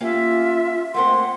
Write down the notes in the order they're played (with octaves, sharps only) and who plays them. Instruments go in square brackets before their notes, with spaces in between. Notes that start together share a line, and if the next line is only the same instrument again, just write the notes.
[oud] A#3 C#4 G4 [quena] F4 [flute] E5
[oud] A3 A#3 C4 [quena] F#5 [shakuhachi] C6